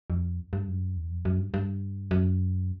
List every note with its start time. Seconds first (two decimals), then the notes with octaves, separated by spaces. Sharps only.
0.10 F2
0.53 G2
0.68 F#2
0.96 E2
1.10 F2
1.25 F#2
1.39 G2
1.54 G2
2.11 F#2